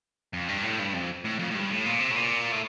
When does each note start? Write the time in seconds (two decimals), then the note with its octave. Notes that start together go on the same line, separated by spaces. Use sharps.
0.33 F2
0.48 G2
0.63 A2
0.79 G2
0.93 F2
1.24 A2
1.39 F2
1.50 A2
1.55 G2
1.70 A2
1.85 A#2
2.00 C3
2.11 A2
2.16 A#2
2.52 A2